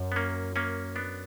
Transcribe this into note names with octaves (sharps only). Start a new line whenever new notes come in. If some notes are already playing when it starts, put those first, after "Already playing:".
Already playing: F#2
B3
A#3 C#4
A#3 C#4
B3 D4